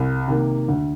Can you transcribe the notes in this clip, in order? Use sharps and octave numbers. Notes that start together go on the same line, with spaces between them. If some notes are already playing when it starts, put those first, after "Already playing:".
Already playing: C2
C3 D#3 A#3
D2